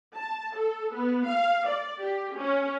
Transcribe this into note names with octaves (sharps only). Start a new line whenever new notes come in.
A5
A4
B3
F5
D5
G4
C#4